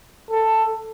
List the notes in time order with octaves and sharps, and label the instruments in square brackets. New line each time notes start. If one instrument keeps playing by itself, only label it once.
[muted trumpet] A4